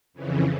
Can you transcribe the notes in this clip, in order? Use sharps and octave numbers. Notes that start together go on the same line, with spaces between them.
F2 C#3 E3